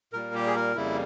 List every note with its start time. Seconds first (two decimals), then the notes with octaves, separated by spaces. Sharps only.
0.13 A#2 G3 A#3 A#4
0.34 G4
0.47 G#4
0.55 A#4
0.75 F2 C#3 G3 A#3 E4